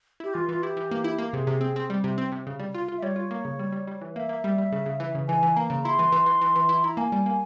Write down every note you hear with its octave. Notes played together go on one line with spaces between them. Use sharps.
E4 G4
E3 F4
E3 F4
E4 G4
E3
A#3
E4
A#3
C3 G#4
C3
C4
C4
G3
C3
C4
C3
C#3
G3
F4
F4
E5
G3 C#5
F4
A#3
C#3
G3
G3
G3
E3
A#3 E5
A#3
G3
G3
C#3
C#3
E3
C#3
E3 G#5
E3
A#3 A#5
C#3
E4 C6
E3
E3
E3
E3
E3
E4
E4 A#5
A#3 G#5
G3
A#3